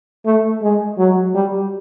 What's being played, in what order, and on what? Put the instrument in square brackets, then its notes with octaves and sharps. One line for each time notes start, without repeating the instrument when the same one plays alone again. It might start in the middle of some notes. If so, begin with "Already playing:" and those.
[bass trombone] A3
G#3
F#3
G3